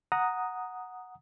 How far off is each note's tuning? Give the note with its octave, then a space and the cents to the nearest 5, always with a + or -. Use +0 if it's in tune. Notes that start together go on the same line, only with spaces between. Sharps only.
F#5 -5 A#5 +0 D#6 +0